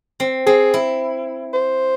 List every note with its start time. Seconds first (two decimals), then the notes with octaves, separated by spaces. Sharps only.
0.20 C4
0.46 C4 G#4
0.74 E4
1.53 C5